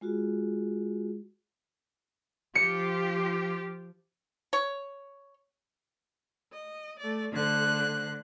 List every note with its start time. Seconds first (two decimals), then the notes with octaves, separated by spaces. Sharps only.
0.01 G#3 F4 F#4 G#4
2.55 F3 F4 G4 C#7
4.53 C#5
6.53 D#5
6.99 A3 D5
7.32 D3 A3 C5 F#6